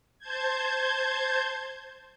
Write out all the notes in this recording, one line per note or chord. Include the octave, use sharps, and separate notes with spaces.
C5 A5 G6 G#6